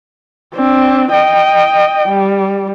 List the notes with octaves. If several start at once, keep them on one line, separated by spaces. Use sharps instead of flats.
C4 D4
D#5 G5
G3